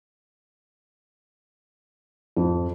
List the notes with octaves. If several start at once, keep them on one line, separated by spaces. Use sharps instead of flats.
F2